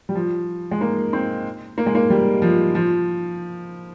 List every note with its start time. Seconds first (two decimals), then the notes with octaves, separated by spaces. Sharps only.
0.09 G3
0.15 F3
0.71 G#3
0.81 A#3
1.13 C4
1.78 A#3
1.86 G#3
1.95 A#3
2.10 G3
2.42 F3
2.75 F3